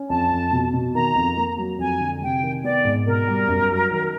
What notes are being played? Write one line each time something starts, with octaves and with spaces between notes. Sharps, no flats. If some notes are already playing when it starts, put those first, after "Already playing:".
Already playing: C#4
F2 A5
F2
B2
B2
D#3 A#5
F2
A#3
F#3
F2 G#5
D3
C3 G5
D#3
B3 D5
G#2
B2 A#4
G3
F#2
F#3
D#3